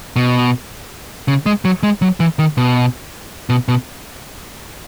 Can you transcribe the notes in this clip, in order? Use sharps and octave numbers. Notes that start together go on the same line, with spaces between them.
B2
C#3
G#3
F#3
G#3
F#3
E3
D#3
B2
B2
B2